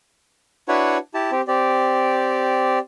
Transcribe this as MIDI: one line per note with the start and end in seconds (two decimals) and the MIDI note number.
0.68 0.98 62
0.68 0.98 64
0.68 0.98 66
0.68 0.98 71
0.68 0.98 73
0.68 0.98 78
1.14 1.31 64
1.14 1.31 67
1.14 1.31 81
1.32 1.41 60
1.32 1.41 67
1.48 2.79 60
1.48 2.79 67
1.48 2.79 74